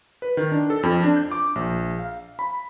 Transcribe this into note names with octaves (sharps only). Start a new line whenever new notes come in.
B4
D#3
D4
A4
F2
D4
G6
D6
A#1
F5
B5